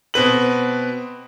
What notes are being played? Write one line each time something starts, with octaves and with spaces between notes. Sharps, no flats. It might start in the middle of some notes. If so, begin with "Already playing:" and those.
B2 C4 B4 F#7